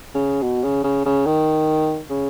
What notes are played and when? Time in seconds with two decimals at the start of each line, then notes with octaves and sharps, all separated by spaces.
0.15 C#3
0.42 B2
0.64 C#3
0.84 C#3
1.06 C#3
1.27 D#3
2.10 C#3